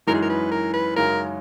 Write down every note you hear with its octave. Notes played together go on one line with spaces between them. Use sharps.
F#2 E3 G#3 D#4 A#4
G#4
A#4
B4
A#4
B4
F#2 C#3 G#3 D#4 A#4